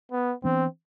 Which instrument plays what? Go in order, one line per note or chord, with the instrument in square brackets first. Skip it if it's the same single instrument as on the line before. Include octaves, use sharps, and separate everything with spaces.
[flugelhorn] B3
[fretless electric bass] E3 B3 D4 [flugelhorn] C4